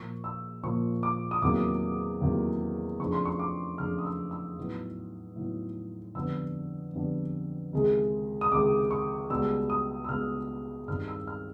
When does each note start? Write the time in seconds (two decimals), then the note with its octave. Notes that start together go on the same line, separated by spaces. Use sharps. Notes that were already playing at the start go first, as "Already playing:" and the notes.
Already playing: A#2 F3 A#3 C#6
0.24 E6
0.63 A#2 F3 A#3 C#6
1.03 D6
1.31 D#6
1.42 E2 C3 D#3 F#3 A#3 D6
2.21 E2 C3 D#3 F#3 A#3
3.00 F2 C#3 F3 A3 D4 C#6
3.12 C6
3.25 C#6
3.40 D6
3.78 F2 C#3 F3 A3 D4 F6
3.98 D#6
4.05 E6
4.31 E6
4.57 A2 F#3 B3 D#4
5.36 A2 F#3 B3 D#4
6.15 F2 D3 G3 B3 D4 E6
6.94 F2 D3 G3 B3 D4
7.73 C#2 C3 D#3 G#3
8.41 D#6
8.52 C#2 C3 D#3 G#3 D6
8.91 C#6
9.30 C#2 B2 G3 E6
9.70 D#6
10.04 E6
10.09 C#2 B2 G3 F6
10.88 G2 D#3 G3 C4 D#4 F6
11.08 E6
11.27 F6